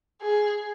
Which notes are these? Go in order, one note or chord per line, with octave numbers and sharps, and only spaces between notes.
G#4